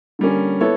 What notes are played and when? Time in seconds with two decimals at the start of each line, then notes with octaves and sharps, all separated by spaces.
0.19 D3 G3 A#3 C#4
0.61 B3 E4 A4 C#5